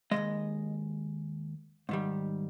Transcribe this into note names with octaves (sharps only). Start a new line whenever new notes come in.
D#2 C#3 G#3 D#5
G#2 D#3 G3